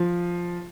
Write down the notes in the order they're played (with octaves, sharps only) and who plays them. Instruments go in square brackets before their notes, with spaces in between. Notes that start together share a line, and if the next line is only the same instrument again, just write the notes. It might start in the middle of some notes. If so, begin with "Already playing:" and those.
Already playing: [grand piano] F3